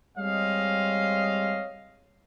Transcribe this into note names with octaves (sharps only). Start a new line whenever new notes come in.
G3 G#3 C4 C#5 D#5 F5